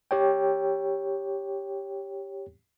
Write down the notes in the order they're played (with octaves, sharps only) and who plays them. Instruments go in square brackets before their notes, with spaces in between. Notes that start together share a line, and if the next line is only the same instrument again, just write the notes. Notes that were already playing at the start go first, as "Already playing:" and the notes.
[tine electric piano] G4 C#5 G5